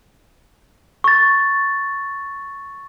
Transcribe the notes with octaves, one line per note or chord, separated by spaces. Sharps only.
C#6 A6